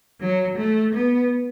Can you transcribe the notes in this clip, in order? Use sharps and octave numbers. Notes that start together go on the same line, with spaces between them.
F#3
A3
B3